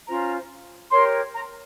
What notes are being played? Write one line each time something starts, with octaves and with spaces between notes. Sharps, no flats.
C#4 F4 C5 A#5
G4 A#4 C#5 C6
A#5